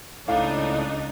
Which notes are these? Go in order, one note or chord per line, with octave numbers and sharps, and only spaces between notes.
C#2 A2 D4 D#4 F5